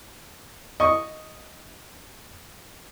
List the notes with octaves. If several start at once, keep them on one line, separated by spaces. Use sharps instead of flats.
D#5 C#6